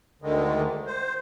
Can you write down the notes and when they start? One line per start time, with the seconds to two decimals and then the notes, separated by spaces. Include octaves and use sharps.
0.22 D2 D3 D#3 G#3
0.87 C5